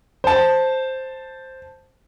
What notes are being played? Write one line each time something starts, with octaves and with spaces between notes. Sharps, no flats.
C5 A5